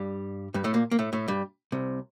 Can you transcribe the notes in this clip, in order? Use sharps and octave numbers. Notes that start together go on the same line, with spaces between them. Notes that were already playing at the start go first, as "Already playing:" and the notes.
Already playing: G2 G3
G2 G3
A2 A3
A#2 A#3
A#3
A2 A3
A2 A3
G2 G3
C2 C3